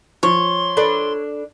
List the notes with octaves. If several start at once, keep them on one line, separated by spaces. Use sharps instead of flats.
F3 C#5 C6
D4 A4 B4